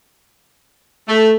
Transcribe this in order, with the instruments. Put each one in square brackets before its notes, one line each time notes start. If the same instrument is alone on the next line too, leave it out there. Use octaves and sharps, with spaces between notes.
[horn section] A3